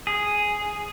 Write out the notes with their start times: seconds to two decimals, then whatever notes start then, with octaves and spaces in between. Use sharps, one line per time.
0.07 G#4